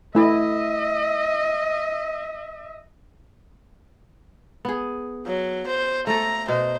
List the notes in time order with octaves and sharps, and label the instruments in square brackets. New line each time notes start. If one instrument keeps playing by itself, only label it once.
[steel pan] A3 E4 [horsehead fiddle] D#5 E5
[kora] B3 G#4
[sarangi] F#3
C5
[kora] A3 A4 [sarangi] A#5
[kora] B2 [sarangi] C5